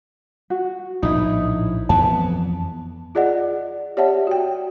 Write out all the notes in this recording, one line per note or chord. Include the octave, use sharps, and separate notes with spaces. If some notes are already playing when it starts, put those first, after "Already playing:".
F#4
A#1 A2 D#4 E4
F2 E3 B3 A5
F4 G#4 D5 D#5 F#5
G4 C#5 D5 E5 F#5 A5
F#4 G5